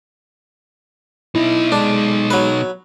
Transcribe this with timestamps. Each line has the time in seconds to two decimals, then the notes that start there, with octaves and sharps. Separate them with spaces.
1.35 B2 D#4 E4
1.72 G#3 D4
2.31 F#3 B4